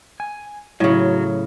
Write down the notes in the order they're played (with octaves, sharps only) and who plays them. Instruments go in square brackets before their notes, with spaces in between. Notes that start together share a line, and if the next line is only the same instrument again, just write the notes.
[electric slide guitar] G#5
[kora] A2 C#3 [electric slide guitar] F#3